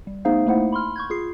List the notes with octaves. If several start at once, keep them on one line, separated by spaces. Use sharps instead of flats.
G3
A3 B3 D#4 G#4 C5 F5
A3 A#3 D#4 E4 C5 F#5
B5 C6 F6
C#6 G6 G#6
F4 G#4 C7